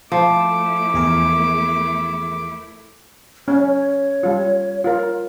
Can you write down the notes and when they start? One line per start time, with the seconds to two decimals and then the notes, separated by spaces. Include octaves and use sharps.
0.12 F3 A3 E4 D6
0.94 E2 G#4 A#4
3.48 C#4 C#5
4.23 G3 F4
4.84 F4 A#4